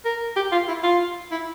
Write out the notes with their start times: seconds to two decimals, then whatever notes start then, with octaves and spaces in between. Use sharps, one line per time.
0.05 A#4
0.36 G4
0.52 F4
0.68 E4
0.83 F4
1.32 E4